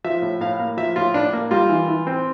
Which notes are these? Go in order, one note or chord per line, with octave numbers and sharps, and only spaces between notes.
F3 E5
A2
A2 F5
A#3
F3 E5
A2 F4
A2 D4
A#3
G3 F4
E3
E3
C4